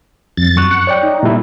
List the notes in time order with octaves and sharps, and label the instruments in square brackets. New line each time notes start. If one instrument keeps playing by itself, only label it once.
[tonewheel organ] F2 A6
[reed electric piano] F#2 C#6 F#6
[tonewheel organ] F#5
[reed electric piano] C#5 D5 G5
[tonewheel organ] D#4
[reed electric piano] A#2 G3 E4